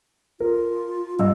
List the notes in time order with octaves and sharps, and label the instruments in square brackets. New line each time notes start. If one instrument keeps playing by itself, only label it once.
[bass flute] F4 [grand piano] A#4
[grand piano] G2 E6 [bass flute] D#5